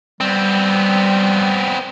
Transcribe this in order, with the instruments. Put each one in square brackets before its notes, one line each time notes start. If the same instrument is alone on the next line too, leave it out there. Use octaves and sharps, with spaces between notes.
[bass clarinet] G3 [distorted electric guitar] B3 C4